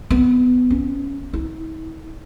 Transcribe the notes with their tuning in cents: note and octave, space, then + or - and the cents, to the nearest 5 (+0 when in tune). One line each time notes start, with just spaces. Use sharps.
B3 +15
C#4 +10
E4 -45